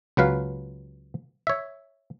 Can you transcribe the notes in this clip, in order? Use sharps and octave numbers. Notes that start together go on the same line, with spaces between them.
C#2 F#3 B4 F5
C#5 E5